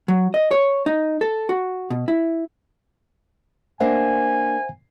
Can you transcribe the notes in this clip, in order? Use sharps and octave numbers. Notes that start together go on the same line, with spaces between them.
F#3
D#5
C#5
D#4
A4
F#4
B2
E4
A#3 D4 C5 E5 F#5 G#5